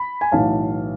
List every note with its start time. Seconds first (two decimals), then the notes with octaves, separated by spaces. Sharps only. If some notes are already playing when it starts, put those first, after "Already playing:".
Already playing: B5
0.21 G#5
0.32 B1 A2 E3 F5 A5